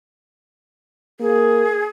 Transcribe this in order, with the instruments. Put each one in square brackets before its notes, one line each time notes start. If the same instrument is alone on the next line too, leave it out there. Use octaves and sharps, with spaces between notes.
[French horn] A#3 [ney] G#4